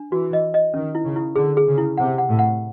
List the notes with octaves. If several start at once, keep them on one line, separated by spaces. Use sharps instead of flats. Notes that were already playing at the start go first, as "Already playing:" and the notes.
Already playing: D4
E3 F#4
D#5
D#5
D#3 C#4
E4
C#3
E4
D3 G#4
G#4
C#3
E4
C3 F#5
F#5
A2
F#5